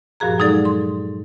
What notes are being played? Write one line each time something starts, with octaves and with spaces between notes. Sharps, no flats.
G2 A#2 F3 F#4 G#4 A#5
F#3 G#3 D#4 G#4 A4 D5
C6